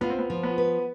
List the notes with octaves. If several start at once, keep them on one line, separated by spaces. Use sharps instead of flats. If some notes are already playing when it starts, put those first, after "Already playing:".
B3 F4
C4
B3
F3
B3
B4